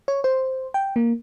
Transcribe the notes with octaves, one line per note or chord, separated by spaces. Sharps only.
C#5
C5
G5
A#3